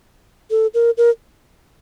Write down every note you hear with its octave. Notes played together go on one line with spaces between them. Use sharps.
A4
A#4
A#4